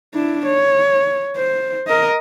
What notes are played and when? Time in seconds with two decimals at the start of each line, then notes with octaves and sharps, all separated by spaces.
0.14 D4 E4
0.46 C#5
1.36 C5
1.87 A#4 D#5